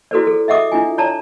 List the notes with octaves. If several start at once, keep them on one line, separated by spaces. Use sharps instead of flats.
E4 F#4 A4 B4 C5 D5
G#4 A4
D#5 E5 F#5 D6 D#6
D4 E4 F4 G#5
C#5 D5 A5 A#5